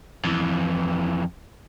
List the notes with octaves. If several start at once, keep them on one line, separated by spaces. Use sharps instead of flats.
F2 E3